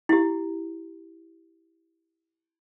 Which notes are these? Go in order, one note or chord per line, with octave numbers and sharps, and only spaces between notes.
E4 G4